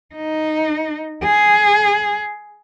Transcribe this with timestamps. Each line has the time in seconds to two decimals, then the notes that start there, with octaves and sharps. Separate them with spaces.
0.15 D#4
1.24 G#4